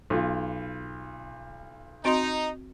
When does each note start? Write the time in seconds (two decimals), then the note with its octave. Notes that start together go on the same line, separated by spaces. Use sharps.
0.10 B1 F4
2.05 C4 D#4 F#4 C6